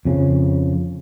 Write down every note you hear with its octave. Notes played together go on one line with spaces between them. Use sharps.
F2 C#3